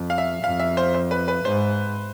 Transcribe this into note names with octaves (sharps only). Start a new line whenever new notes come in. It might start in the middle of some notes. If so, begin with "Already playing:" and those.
Already playing: F2
F5
E5
F2 F5
E5
C5
C5
B4
B4
G#2 C5